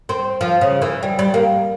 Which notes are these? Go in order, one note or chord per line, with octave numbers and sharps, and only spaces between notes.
C4
F3
C#3
E3
G3
G3
A#3